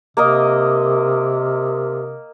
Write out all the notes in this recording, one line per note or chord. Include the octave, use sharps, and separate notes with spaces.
C3 A#3 A#4 D#5